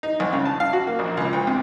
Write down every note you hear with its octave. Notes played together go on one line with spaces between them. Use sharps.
D#4
C2
C#3
A5
F5
F#4
A#3
A#1
C#2
D2
C3